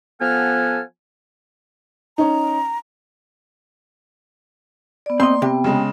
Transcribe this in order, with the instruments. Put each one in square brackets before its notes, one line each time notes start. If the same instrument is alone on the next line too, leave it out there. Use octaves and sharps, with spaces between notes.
[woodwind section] F3 B3 A4 F#5 G#5 F6
[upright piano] C#4 D#4 [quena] A#5
[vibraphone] B3 D5
[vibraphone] A#3 D5 [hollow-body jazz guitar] C4 D#5 [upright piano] C6
[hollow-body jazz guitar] C3 [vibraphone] B3 G5
[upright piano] C#3 G#3